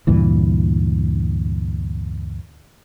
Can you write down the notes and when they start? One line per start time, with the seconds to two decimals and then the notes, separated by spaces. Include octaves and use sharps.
0.07 D2 G2 A#2 E3